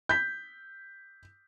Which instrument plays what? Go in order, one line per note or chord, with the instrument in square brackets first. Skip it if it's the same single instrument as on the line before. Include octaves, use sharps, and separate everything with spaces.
[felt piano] G6 B6